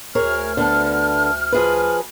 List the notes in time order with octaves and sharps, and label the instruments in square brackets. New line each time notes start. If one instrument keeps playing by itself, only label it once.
[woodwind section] D2 F6 [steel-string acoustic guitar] G#4 A#4 C#5
[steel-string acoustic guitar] D3 B3 A5
F3 G#4 B4